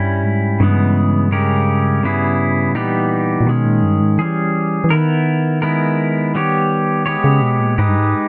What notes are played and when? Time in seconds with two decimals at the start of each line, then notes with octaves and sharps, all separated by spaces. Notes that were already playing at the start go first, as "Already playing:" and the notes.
Already playing: G2 G3 C#4 E4
0.24 G#2
0.60 G2 C#3 E3 G#3 B3
1.32 C#3 G#3 C#4 G4 A#4
2.03 C#3 G3 B3 E4 G#4
2.70 G#2
2.75 A#2 E3 G3 B3 D#4 G4
3.41 A#2
3.47 B2 D#3 G#3 C#4
3.65 A#2
3.83 G2
4.02 G#2
4.18 E3 G3 C#4 G#4
4.84 E3
4.90 D#3 B3 E4 A#4
5.62 G#3 B3 E4 A#4
6.35 G3 B3 G4 C#5
7.06 G#3 B3 G4 C#5
7.24 C#3
7.42 B2
7.60 A#2
7.78 G#2 G#3 D#4 G4 B4
7.88 G2
7.98 G#2